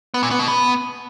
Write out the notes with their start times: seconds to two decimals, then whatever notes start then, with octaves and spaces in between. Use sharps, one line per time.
0.14 B3
0.23 A#2
0.31 B3
0.39 B2
0.48 B3